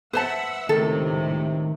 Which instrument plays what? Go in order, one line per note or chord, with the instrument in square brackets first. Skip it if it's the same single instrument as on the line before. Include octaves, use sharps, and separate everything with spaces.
[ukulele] B4 C5 A5 [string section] E5 F#5 E6
[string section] C#2 A2 C3 [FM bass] D#3 [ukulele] A4